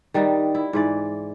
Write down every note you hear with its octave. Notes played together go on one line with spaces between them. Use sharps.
D#3 G3 D4 D#4
E4
G#2 E3 D5